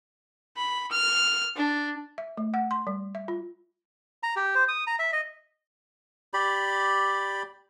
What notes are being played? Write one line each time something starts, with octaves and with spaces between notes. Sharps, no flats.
B5
F6
D4
E5
A3
F#5
C6
G3
E5
F4
A#5
G4
C5
D#6
A#5
E5
D#5
G4 D5 B5